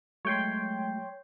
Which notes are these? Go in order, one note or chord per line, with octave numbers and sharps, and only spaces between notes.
F#3 G#3 A3 C#5 G5 C6